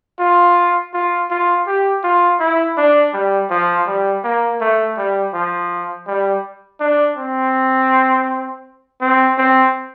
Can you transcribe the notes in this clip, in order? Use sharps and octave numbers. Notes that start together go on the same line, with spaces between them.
F4
F4
F4
G4
F4
E4
D4
G3
F3
G3
A#3
A3
G3
F3
G3
D4
C4
C4
C4